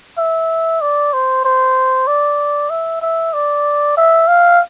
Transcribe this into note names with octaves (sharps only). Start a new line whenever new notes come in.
E5
D5
C5
C5
D5
E5
E5
D5
E5
F5